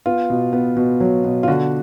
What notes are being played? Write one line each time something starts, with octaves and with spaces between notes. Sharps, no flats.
B3 F4
B2
B3
B2
F#3
B2
F4
D3 F#4